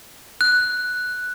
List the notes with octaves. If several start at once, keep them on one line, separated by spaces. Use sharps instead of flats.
F#6